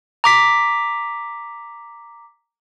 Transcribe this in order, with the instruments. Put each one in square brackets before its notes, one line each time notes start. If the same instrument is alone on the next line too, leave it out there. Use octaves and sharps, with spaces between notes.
[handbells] A#5 D6 B6